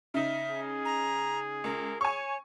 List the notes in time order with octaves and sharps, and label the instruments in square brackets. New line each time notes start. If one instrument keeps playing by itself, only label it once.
[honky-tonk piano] C#3 D#4 [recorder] E5
[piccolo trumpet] G#4
[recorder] A#5
[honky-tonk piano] C#2 [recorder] A#4
[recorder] C#5 [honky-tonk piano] G#5 C#6